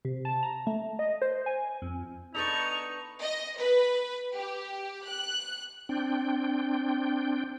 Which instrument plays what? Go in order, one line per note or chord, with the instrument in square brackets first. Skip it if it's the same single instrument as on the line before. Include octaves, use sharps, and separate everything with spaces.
[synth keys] C3
A5
A#5
A3
D#5
C5
G#5
F2
[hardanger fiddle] B3 C#6 [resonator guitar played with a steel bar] D4 A4 B4 [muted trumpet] D#4 [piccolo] F7
[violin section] D#5
B4
G4
F#6
[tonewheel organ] C4 D4 G5